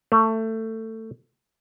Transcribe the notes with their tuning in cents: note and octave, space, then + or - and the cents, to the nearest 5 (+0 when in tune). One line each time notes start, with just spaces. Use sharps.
A3 +20